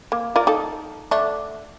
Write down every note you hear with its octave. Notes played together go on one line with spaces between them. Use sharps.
A#3
F4 A#4 D5
D#4 A4
D3 A3 D4